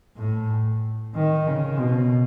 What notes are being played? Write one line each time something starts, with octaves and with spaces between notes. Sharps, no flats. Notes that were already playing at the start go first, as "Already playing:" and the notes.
A2
D#3
C#3
B2